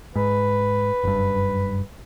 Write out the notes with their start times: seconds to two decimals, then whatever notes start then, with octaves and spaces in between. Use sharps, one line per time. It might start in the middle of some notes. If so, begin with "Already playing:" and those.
0.16 G#2 B4
1.03 F#1 G2